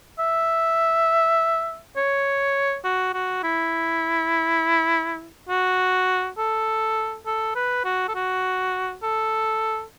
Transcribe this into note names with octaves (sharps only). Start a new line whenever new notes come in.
E5
C#5
F#4
F#4
E4
F#4
A4
A4
B4
F#4
A4
F#4
A4